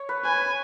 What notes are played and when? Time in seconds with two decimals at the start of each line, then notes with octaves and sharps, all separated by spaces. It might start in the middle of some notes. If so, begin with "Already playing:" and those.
Already playing: C#5
0.09 B4
0.25 B4 G#5